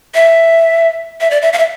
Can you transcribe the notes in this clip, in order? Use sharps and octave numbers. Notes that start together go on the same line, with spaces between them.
E5
E5
D5
E5
F5
E5